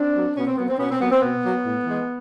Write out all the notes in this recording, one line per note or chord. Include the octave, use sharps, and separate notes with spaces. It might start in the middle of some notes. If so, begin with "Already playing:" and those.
Already playing: C4 D4
F#3 A#3
B2 B3 C#4
C4
F#3 A#3 B3
C4
B2 B3 C#4
C4
F#3 A#3 B3
C4
B2 B3
F#3 A#3
A2
E3 G#3